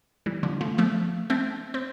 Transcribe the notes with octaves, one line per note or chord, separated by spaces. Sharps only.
E3 G3
D3 F3
F3 A3
F3 A3
A3 C4
C4